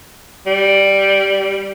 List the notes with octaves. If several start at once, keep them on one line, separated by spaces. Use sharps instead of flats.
G3